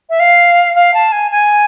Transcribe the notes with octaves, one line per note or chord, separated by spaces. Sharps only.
E5
F5
F5
A5
G#5
G#5